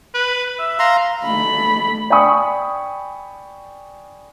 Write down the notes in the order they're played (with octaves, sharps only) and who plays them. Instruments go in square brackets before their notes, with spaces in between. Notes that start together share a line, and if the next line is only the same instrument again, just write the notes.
[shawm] B4
E5
[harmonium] F5 [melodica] A#5 C6
[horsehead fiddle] A3 B5
[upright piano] D5 G5 G#5 B5 C#6 D#6